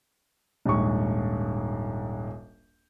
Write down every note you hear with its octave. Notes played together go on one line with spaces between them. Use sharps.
D#1 A#1 G#2 C#6